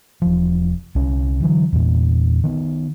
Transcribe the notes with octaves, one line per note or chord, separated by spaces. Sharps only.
E1 F3
C2 C#4
D3 E3 F#3
E2 A#2
D#3 B3